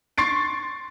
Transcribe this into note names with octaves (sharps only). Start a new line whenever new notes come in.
C6 C#6 A6 C7 D7